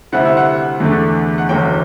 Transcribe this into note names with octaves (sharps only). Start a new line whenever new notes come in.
D2 C3 G3 C4 E4 F#5
E5
F#5
E2 D3 A3 D4
F#5
F#1 E2 D3 F#3 G5